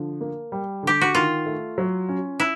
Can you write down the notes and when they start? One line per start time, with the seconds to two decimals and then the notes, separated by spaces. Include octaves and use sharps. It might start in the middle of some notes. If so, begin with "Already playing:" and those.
Already playing: D3 F3
0.21 A#3
0.52 G3
0.83 D3 G4
1.01 F#4
1.15 D#3 F4
1.46 A3
1.78 F#3
2.09 C#4
2.40 E4